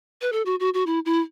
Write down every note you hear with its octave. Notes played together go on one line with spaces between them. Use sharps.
B4
A4
F#4
F#4
F#4
E4
E4